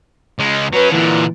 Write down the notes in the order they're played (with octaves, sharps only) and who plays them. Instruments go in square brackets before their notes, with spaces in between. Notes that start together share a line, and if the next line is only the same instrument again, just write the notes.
[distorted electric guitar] C#2 G#3
[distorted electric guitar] F#3 C#4 [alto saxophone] B4
[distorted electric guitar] A#2 D3 [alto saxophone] E3